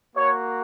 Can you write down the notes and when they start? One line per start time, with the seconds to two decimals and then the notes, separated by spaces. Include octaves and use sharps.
0.15 A#3 F#4 C#5